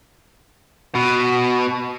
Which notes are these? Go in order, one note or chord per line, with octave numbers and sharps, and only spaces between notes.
B2